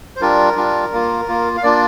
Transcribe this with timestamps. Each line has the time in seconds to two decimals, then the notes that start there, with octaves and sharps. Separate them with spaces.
0.16 C5
0.21 G3 D4 F4 A#4
0.56 G3 D4 F4
0.93 A#3 F4
1.28 A#3 F4
1.57 F5
1.63 A#3 D4 F4 D5